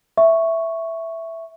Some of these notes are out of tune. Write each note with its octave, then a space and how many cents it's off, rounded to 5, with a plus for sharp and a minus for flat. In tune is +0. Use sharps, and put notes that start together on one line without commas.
E5 +0 C#6 +0